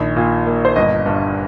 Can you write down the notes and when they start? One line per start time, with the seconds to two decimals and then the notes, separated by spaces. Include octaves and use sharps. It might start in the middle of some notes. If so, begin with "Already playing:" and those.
Already playing: A#1 D#3
0.16 A#2
0.47 A#3
0.65 C5
0.76 G1 D#5
1.06 G2